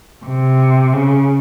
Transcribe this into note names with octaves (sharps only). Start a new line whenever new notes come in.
C3
C#3